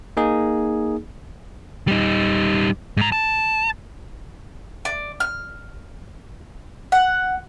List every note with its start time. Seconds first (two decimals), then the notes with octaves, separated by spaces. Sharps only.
0.17 A#3 D#4 G#4
1.88 G3 D#4
2.97 G#2 A#5
3.12 A5
4.85 D5
5.20 F6
6.92 F#5